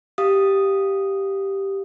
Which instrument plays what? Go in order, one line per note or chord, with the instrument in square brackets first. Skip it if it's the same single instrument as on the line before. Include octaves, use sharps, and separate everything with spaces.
[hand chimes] G4 F5 D#6